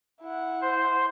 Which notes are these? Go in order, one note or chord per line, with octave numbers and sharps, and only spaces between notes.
E4 F#5
C5